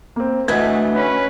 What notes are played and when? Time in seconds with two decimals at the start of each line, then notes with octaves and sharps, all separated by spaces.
0.16 A#3 C4
0.48 D2 E3 A3 D#5 F#5 G#6
0.95 C#4 B4